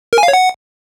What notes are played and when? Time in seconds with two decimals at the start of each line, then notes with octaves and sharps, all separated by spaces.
0.13 A#4
0.18 G#5
0.23 F5
0.28 C#5
0.33 F#5